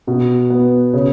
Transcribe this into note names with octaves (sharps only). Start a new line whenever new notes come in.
B2
B3
C#3